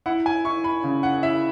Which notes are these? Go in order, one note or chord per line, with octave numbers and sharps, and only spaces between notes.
E4 F#5
G#5
E4 C#6
B5
C#3
F#5
E4 E5